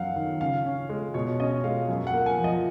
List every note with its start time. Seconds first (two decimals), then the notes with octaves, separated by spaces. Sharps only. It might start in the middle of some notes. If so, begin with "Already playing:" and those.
Already playing: F#2 F#3 F5 F#5
0.16 D#3
0.41 C#3 F5
0.65 C#4
0.89 G#3
1.14 B2 C#5
1.40 C#4 D#5
1.64 G#3 F5
1.89 F#2
2.07 F#5
2.14 A#3
2.26 G#5
2.38 F3
2.44 D#5